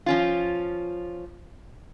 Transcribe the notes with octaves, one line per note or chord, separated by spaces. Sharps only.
F3 C#4 F4